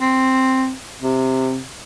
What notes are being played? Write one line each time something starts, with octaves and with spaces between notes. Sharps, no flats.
C4
C3